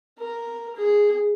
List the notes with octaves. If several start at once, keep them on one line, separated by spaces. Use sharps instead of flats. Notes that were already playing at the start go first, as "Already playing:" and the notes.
A#4
G#4